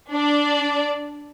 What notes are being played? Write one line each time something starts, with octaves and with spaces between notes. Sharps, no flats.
D4 D5